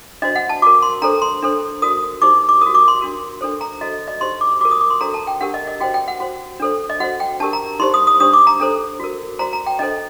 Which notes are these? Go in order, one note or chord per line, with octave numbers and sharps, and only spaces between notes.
D4 F#4 C5 D#5
F#5
A5
F#4 A#4 D6
C6
D4 A4 C5 A#5
C6
D4 A4 C5
F#4 A#4 D#6
D#4 G4 C5 D6
D6
F#4 A#4 D#6
D6
C6
D4 F#4 A#4
D4 A4 C5
A#5
F#4 A4 C5 D#5
D#5
D#4 G4 C5 C6
D6
F#4 A#4 D6
D#6
D6
C6
D4 F#4 A4 C5 A#5
A5
G5
D4 G4 A#4 F#5
D#5
D#5
F#4 C5 G5
G5
F#5
F#4 C5
D4 A4 C5
D#5
F#4 C5 F#5
G5
D4 G4 A#4 A5
A#5
D#4 G4 C5 C6
D#6
D#6
D4 G4 C5 D#6
D6
A#5
D4 A4 C5
F#4 A#4
F#4 C5 A#5
A#5
G5
D4 A4 C5 D#5